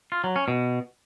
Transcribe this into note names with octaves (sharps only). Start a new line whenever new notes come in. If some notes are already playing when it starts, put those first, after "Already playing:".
F4
F#3
C#4
B2